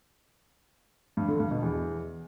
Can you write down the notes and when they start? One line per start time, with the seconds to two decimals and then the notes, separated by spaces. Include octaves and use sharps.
1.17 G2
1.28 D3
1.40 G2
1.51 B2
1.62 E2